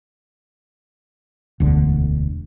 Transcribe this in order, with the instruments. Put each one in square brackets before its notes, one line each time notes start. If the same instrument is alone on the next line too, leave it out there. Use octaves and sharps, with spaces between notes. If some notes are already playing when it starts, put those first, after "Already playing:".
[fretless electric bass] E1 D2 D3